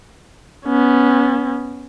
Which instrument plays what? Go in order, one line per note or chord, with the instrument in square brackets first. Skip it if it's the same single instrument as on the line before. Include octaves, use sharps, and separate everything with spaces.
[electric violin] B3 C#4